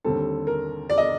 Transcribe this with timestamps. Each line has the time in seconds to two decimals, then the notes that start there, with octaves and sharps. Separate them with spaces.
0.04 D#2 D3 G3 C4 A4
0.47 A#4
0.90 D5
0.98 D#5